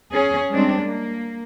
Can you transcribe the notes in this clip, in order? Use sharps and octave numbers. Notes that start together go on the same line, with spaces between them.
C#4 G#4
G3 G#3 C4 D4
A#3